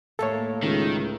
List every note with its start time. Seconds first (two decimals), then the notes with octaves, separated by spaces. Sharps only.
0.19 D#2 A2 A#3 A4 C#5
0.63 C#2 D#3